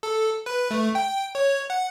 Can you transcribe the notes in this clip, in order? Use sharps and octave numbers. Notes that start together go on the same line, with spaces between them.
A4
B4
A3
G5
C#5
F#5